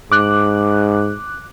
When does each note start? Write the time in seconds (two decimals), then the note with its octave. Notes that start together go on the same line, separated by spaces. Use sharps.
0.12 G#2 D6 F#6